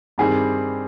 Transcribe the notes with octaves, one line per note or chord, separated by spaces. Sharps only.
G2 D#3 G3 C4 G#4